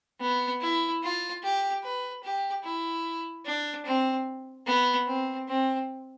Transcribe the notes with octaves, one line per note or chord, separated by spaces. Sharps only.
B3
E4
F4
G4
B4
G4
E4
D4
C4
B3
C4
C4